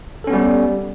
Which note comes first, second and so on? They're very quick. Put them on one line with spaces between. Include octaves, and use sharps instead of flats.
A4 C#4 B3 G3